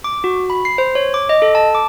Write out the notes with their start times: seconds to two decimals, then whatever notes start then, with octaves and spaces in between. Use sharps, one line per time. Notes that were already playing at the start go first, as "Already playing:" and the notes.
0.04 D6
0.24 F#4
0.50 B5
0.65 C7
0.78 C5
0.95 C#5
1.14 D6
1.29 D#5
1.42 A4
1.55 A5
1.75 D6